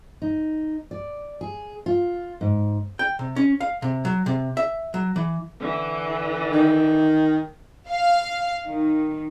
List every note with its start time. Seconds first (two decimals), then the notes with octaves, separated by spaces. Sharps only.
0.22 D#4
0.91 D5
1.41 G#4
1.86 F4
2.41 G#2
2.99 G5
3.19 C3
3.36 C#4
3.61 F5
3.82 C3
4.05 F#3
4.26 C3
4.57 E5
4.94 F#3
5.16 E3
5.60 D3 E3
6.52 D#3
7.90 F5
8.66 D#3